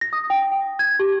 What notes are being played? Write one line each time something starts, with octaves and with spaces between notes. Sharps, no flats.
A#6
D#6
G5
G5
G#6
G4